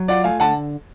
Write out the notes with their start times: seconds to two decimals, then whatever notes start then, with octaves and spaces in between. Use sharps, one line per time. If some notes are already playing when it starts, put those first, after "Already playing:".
Already playing: F#3
0.08 F4 D5 F#5
0.24 A3 F5 G#5
0.40 D3 F#5 A5